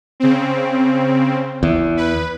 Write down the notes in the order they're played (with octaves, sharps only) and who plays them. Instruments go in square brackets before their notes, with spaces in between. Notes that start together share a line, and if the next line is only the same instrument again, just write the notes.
[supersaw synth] C#3 C4
[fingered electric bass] E2
[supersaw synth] B4